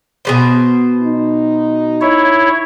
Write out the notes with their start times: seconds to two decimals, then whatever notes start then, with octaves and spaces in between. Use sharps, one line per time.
0.25 B2 G3 C5
1.02 D#4
2.01 E4 C#5